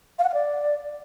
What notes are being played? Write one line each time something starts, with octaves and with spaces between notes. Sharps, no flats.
F5
F#5
F5
D5